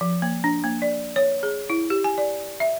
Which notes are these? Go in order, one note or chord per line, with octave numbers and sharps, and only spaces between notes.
F3
A#3
D4
A#3
D5
C#5
G#4
E4
G4
G#5
D5
E5